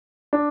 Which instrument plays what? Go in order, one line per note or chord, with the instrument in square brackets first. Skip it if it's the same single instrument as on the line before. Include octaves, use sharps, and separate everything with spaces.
[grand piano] D4